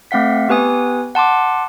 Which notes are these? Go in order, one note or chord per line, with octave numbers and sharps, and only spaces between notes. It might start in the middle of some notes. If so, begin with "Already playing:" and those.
A3 C4 F5 F#5 B6
B3 G4 B4 G#5 D#6
F#5 A5 C6 D6